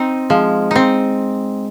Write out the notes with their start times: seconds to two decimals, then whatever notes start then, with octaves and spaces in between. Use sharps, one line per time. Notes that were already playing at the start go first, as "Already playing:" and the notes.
Already playing: C4 D#4
0.30 F3 G#3
0.71 C4 D#4